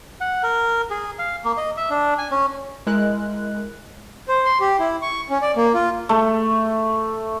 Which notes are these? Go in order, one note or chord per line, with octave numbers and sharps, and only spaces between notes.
F#5
A#4
G#4
F5
A#3
D#5
E5
D4
G#5
C#4
G#3 E4 A#4 F#6
C5
C6
G4
E4
C#6
C#4
D5
A#3
F4
A3